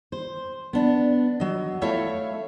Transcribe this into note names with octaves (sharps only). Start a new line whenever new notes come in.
C5
B3 D4
F#3 D#5
A3 E4 A4 C#5 E5 F5